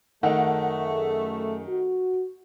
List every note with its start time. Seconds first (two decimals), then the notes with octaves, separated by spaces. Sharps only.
0.23 F#2 D#3 A3 D#4 G#4 F#5
1.67 F#4